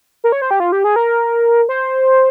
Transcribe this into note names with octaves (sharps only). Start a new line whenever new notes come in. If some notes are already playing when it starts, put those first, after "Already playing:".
A#4
C#5
C5
G4
F4
G4
G#4
A#4
C5